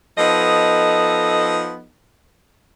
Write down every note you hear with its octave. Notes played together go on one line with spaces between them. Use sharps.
F3 B3 D#4 A4 D#5